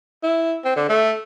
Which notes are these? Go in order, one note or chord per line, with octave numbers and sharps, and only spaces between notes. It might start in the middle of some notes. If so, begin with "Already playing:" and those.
E4
C4
D3
A3